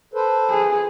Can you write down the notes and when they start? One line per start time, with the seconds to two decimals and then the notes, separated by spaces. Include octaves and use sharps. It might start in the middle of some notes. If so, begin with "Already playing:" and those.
0.14 A4 B4 C5
0.50 G#4